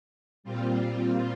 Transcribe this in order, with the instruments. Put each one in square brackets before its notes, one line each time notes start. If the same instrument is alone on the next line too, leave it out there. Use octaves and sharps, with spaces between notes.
[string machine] A#2 G3 C4 F4